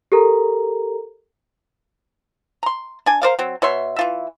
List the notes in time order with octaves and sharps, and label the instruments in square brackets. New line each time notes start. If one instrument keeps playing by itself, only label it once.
[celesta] G4 A4 A#4 A#5
[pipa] A#5 C6
D4 G#5
A#4 C5 D5 F5
F#3 C4
B2 C#5 E5 C6
E3 F4 E5